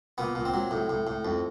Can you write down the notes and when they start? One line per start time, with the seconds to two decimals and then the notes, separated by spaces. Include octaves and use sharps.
0.18 A#2 B3
0.35 A#2
0.45 C4
0.54 F#3
0.71 A2
0.90 A2
1.07 A2
1.25 F2